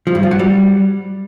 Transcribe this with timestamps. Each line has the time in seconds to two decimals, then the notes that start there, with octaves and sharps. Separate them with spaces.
0.07 F3
0.15 G2
0.23 F3
0.31 F#3
0.39 G3